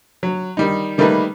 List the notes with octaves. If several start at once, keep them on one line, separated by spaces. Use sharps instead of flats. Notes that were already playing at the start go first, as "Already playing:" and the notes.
F#3
D#3 G3 D#4
D#3 G3 A3 A#3 D#4 B4